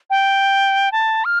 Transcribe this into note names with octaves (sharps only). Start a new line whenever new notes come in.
G5
A5
F6